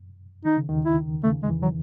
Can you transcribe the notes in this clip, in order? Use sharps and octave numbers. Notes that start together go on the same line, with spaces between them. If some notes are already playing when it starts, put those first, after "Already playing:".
Already playing: F#2
D#3 D#4
C#3
D#2 D#3
E4
C#3 A3
G#3
E2 E3
F#3